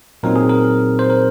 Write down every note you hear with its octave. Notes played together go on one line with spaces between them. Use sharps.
A#2 F#3 C4 D#4 A#4
G#4
A#4
C5
A#4